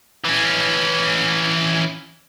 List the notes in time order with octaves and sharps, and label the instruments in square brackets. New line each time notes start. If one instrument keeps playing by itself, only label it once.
[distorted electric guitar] E3 C#4